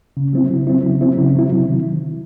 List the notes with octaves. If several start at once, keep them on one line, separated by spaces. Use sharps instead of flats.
C#3
F#3 C4 E4
C#3
F#3 C4 E4
C#3
F#3 C4 E4
C#3
F#3 C4 E4
C3
D#3